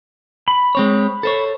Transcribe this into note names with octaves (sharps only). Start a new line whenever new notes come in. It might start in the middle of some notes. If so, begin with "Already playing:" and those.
B5
G#3 C4 C#5
A4 C5 C#5